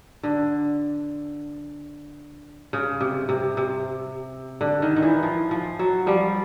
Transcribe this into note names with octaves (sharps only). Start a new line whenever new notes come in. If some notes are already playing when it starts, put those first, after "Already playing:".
D3
C#3
C3
C3
C3
D3
D#3
D#3
E3
F3
F3
F#3
F3 G3